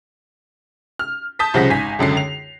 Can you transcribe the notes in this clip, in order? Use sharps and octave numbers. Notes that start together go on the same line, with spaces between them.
F6
A5 D#6 G6 B6
C2 C#3 F3 F#5 A#6 B6
G#1 G#5 B6
C#2 F#2 D3 C7
F7